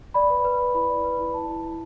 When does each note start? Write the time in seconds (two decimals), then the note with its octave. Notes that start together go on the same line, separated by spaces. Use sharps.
0.14 D5 B5
0.30 B4
0.44 B4
0.59 B4
0.74 E4 B5
0.90 D5
1.04 B4
1.19 E4
1.34 E4 A5
1.49 E4
1.64 E4